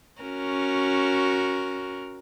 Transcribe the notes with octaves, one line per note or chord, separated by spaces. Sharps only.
C#4 F#4 A#4